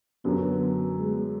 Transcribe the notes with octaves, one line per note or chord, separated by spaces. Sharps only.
F#2 D3 F#3 B3
G#3